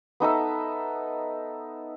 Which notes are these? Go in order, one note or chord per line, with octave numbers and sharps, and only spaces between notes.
B3 D#4 A4 E5